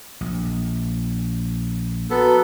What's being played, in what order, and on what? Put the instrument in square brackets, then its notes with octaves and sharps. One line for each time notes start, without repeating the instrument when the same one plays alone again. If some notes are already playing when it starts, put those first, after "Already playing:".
[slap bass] A#1
[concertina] B3 A4 [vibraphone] F#4 B4 A#5